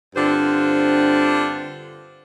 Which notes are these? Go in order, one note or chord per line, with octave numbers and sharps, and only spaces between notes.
G2 D3 C4 D4 F4 C5